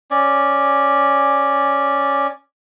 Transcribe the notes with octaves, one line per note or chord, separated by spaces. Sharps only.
C#4 D5